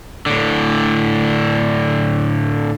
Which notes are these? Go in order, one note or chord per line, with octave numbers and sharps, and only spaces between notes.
A2 D3